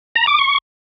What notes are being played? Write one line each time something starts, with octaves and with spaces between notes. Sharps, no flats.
A#5
D6
C#6